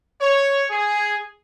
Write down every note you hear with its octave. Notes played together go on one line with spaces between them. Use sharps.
C#5
G#4